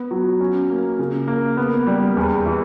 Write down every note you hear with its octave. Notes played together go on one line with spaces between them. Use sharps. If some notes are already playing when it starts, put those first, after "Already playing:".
Already playing: B3
F#3
C#4
A#3
C#3
A#3
B3
G3
E2
E3